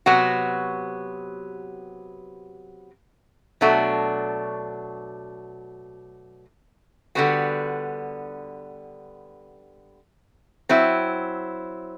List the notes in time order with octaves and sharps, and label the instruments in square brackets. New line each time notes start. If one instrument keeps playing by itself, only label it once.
[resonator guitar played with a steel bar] C3 F#3 B3 F#4
B2 F#3 A3 D4 F#4
D3 G3 B3 F#4
F#3 C4 E4